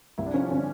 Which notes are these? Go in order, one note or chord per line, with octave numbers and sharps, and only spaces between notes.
C2 E4
D4
F3 C#4
C4
D3 C#4